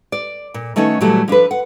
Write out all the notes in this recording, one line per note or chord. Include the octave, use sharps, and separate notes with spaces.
D5
A#2
D#3 A3 B3 C#4 D#4
A#2 E3 F#3 G3 A3
F3 D4 A4 B4
F#5